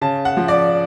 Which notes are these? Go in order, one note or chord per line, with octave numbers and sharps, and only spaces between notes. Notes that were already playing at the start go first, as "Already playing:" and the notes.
C#3 A5
F#5
F3
D5